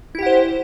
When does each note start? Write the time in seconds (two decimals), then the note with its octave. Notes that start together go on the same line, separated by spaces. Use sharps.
0.15 E4
0.19 G4
0.22 F#5
0.26 C5